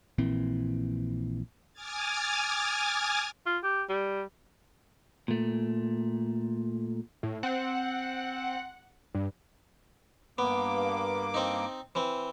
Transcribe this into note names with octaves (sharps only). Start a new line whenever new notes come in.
A#1 A#2 E3 C4
G#5 D6 D#6 F6 G#6 A6
F4
G4
G3
A#2 A3
A2
C4 F#5
G2
G2 A#3 B3 D6
C4 D#4
E3 C4